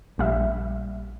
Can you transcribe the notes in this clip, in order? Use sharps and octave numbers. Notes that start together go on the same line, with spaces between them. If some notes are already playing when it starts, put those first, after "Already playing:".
A#1 G3 E5